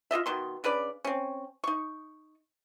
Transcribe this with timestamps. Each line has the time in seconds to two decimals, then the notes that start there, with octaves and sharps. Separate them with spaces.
0.11 F4 G#4 D#5 E5
0.26 B2 D#3 C6
0.64 C#3 D4 B4 D5
1.05 C4 C#4
1.64 D#4 C#6